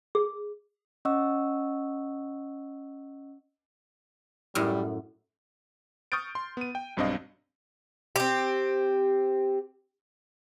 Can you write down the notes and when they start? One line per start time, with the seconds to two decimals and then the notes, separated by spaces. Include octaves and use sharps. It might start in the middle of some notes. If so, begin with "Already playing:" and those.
0.15 G#4
1.05 C#4 D#5 F#5 C#6 E6
4.55 F#2 A2 G3
6.12 C#6 D#6 F6 G6 A6 D7
6.35 C6
6.57 B3 D#7
6.75 G5
6.97 B1 G2 C4 D4 D#5 F5
8.16 C4 G4